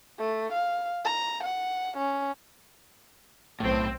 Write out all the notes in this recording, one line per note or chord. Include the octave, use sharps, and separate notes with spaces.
A3
F5
A#5
F#5
C#4
B1 A2 C4